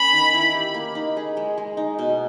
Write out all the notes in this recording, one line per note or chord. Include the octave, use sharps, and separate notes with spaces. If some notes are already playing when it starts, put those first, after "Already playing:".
Already playing: A#3 C#4 B5
D#3
E4
G4
A#3
D#4
G#4
G#3
G#3
D#4
B2